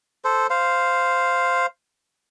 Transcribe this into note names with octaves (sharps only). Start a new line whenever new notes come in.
A4 C5
C5 F5